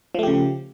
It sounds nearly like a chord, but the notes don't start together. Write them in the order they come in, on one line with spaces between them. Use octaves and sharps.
F3 A3 G4 C#3